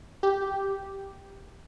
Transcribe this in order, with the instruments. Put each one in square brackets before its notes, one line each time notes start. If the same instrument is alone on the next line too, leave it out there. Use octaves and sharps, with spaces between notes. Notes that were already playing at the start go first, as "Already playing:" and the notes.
[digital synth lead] G4